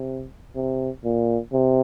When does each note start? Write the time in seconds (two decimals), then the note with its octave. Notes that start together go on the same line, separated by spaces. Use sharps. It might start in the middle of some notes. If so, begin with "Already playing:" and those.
Already playing: C3
0.55 C3
1.04 A#2
1.53 C3